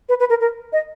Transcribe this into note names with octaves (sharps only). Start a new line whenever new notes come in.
B4
B4
A#4
A#4
D#5